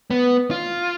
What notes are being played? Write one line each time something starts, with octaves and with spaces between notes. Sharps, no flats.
B3
F4